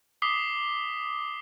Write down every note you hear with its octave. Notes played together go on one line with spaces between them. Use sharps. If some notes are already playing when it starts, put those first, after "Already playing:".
D6 D#6 B6 C7 G7